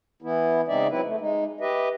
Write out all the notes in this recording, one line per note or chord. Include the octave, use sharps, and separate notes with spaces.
E3 B3 E4
C#3 G#3 C4 D#4 D5 E5
F#3 C4 E4 B4
A3
G#3 D#4
G4 B4 D#5 E5